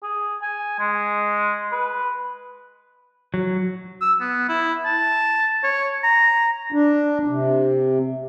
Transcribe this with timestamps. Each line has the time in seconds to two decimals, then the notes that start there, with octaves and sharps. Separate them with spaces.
0.03 G#4
0.42 G#5
0.79 G#3
1.72 B4
3.34 F#3
4.01 E6
4.21 B3
4.49 E4
4.85 A5
5.64 C#5
6.03 A#5
6.72 D4
7.28 C3